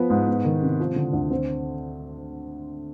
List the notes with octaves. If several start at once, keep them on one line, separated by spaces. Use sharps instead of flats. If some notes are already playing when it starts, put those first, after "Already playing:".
Already playing: F3 B3
G#2
B3
D#3
C3
F3
D3
D2
C4